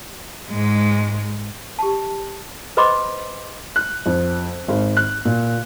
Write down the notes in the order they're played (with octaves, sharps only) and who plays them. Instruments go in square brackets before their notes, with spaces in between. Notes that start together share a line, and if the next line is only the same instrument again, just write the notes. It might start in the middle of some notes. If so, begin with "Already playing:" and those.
[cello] G#2 G#3
[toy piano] G4 A5
B4 C5 D#5 B5 C6 D6
[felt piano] F#6
F2
G#1
F#6
A#2